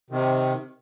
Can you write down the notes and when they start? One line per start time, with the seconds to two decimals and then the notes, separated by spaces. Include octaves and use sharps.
0.10 C3 D#3